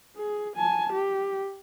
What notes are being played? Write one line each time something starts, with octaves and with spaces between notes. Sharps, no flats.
G#4
G#5 A5
G4